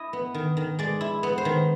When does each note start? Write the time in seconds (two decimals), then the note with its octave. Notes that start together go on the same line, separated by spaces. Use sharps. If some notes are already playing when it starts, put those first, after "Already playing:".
Already playing: E4 D#5
0.13 B3
0.34 D#3
0.57 D#3
0.79 G#3 D5
1.01 E4
1.23 B3
1.38 C5
1.45 D#3